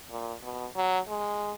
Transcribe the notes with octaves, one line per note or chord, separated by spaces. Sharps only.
A#2
B2
F#3
G#3